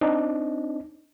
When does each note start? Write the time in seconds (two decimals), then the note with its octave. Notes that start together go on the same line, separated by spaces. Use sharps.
0.01 C4 D4 D#4